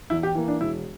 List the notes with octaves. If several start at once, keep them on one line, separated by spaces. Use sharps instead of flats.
E2 E4
G4
E3 A#3
D4
E1 E4